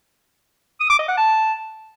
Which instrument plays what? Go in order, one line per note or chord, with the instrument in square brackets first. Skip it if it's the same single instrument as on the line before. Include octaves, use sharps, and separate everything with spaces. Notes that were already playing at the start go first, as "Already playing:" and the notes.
[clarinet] D#6
D6
D#5
F#5
A5